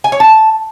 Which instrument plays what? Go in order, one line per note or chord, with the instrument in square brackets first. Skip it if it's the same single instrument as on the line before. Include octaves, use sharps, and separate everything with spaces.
[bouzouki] G#5
C#5
A5